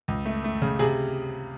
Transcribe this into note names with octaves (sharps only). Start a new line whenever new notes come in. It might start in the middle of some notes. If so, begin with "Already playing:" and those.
C#2
A3
A3
C#3
C3 G#4